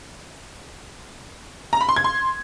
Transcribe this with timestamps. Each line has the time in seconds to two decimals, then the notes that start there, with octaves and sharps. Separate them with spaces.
1.73 A#5
1.81 B5
1.89 C6
1.96 G#6
2.04 C6